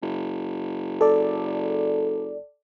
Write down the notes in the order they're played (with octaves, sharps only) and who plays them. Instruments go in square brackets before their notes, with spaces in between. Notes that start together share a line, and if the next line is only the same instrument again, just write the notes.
[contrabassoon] F#1
[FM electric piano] A4 D5